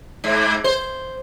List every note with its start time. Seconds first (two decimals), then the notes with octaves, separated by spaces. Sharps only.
0.24 G#2
0.64 C5